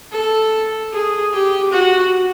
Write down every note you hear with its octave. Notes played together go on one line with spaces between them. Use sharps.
A4
G#4
G4
F#4